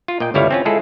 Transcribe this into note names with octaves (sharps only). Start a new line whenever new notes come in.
F4
A#2 D#5 G5
G1 C#2 G3 E4 C#5 F5
C4 C#4 F4
G#3 E4 F4 G#4 A4